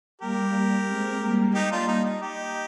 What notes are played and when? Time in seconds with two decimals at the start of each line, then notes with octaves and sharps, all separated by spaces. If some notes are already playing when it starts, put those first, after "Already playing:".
0.21 G3 A#3 G4 A#4
0.88 G#3 C4
1.22 G3 A#3
1.54 D#4 G4
1.72 D4 F4
1.88 D#4
2.05 D#4
2.21 D#4 G4